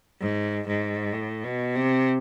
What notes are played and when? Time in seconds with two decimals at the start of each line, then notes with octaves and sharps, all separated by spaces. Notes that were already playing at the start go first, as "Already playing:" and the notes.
0.21 G#2
0.67 G#2
1.13 A2
1.44 B2
1.75 C3